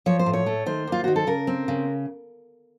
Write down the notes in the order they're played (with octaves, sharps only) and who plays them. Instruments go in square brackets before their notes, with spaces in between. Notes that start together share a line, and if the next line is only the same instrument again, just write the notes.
[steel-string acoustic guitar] F3 C#5
C5
A2
C#5
A3
D#3 C5
D#2 F4
D#3 F#4
A4
C#3 A#4
C4
C#3